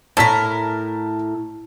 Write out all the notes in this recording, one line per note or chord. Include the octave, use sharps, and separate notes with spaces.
A2 A#4 A5 B6